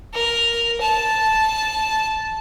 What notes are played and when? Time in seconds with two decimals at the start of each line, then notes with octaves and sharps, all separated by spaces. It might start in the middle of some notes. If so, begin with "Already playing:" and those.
0.14 A#4
0.81 A5